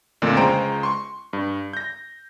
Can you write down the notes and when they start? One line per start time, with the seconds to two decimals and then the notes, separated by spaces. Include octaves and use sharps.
0.22 F2 A#2 D3 A3 D4
0.37 C#2 G#3 C5 G5 A#5 D7
0.83 C6 C#6
1.33 G2
1.73 G6 A#6